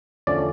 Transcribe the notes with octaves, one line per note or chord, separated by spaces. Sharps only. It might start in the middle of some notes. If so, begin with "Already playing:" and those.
E2 D3 F3 A3 C#4 D5